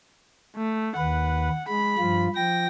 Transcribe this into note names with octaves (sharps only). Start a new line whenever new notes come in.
A3
D#2 B4 F#5
G#3 B5
G2 F3 F4
F3 G5 A#6